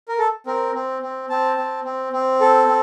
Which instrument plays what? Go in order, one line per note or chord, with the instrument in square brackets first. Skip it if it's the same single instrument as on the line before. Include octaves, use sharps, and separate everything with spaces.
[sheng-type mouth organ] A#4
A4
C4 A#4
C4
C4
C4 A5
C4
C4
C4
A4
C4